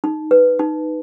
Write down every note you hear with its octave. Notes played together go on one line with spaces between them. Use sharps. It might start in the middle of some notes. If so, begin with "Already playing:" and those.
D#4
B4
D#4